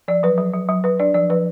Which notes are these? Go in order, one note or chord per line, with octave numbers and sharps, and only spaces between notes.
F3 D5
F#3 B4
F#3
F#3
F#3
F#3 B4
D4 D5
F3 D5
F3 B4